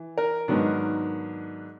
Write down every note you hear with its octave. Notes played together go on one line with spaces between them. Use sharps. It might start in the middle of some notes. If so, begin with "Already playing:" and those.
Already playing: E3
A#4
G#2 D#3 F#3 B3 D4